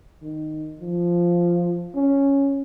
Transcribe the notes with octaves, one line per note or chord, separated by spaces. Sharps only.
D#3
F3
C#4